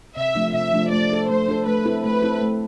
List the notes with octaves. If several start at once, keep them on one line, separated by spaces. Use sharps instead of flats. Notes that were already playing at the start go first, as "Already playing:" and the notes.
C3 E5
F3 A3 D4
C3 E5
F3 A3 D4
A3 D5
D4 A4
A3 C5
D4 A4
A3 B4
C4 E4 A4
A3 B4
C4 E4 A4
A3